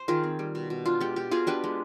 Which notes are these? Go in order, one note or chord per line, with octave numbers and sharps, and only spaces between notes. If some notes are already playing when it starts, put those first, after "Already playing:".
Already playing: C5
D#3 F4 G#4
C4
G3
B2
B2
D4 F4
G#3 G4
B2 G4
B2 F4 G#4
D4 G4 B4
G#3